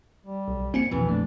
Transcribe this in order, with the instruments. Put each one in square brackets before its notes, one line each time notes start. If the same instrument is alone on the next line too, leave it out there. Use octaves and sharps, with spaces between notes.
[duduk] G3
[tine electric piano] B1
[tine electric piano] A#3 G#5 C#7 [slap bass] C4
[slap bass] A#1 F2 [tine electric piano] B2 [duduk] E3
[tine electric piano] A3 [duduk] D4